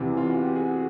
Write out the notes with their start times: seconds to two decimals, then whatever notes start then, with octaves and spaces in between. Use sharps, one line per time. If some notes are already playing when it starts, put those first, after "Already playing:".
Already playing: E2 C3 E3
0.17 F4
0.30 F#4
0.43 G4
0.55 F#4 G#4